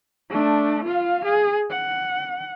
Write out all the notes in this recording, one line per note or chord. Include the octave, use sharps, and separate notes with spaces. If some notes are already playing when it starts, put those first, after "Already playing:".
A3 D4
F4 F5
G#4
F#5